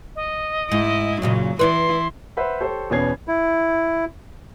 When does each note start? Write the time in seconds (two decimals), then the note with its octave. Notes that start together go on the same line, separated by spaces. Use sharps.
0.16 D#5
0.72 G#2 E4
1.22 F#2 A#2 C#3 F#3
1.59 E3 E4 B4 C#5 D5 C6
2.37 B4 C5 E5 F#5 B5
2.60 G4 A4 C5 C#5
2.90 E2 B2 B3 C#4 G#6 C7
3.28 E4